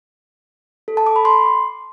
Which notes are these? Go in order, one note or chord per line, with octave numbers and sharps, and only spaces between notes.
A4
A5
D6
B5
C6